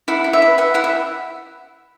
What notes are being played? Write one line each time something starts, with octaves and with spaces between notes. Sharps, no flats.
E4 F#5
E4
E5
B4
B4 F#5
E4 F#5
E5